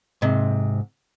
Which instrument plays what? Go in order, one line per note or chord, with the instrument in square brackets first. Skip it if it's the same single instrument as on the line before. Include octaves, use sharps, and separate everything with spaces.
[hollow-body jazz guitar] G#2 C3